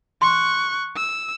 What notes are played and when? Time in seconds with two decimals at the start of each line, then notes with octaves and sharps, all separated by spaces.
0.22 C6 C#6 F#6
0.96 E6